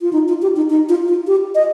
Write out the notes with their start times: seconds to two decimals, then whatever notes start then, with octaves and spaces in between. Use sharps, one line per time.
0.01 F4
0.13 D#4
0.28 F4
0.42 G4
0.56 D#4
0.70 D#4
0.89 F4
1.08 F4
1.27 G4
1.55 D#5